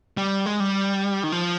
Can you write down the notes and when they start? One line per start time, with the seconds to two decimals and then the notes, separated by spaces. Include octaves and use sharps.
0.17 G3
0.46 G#3
0.60 G3
1.24 D#3
1.32 F3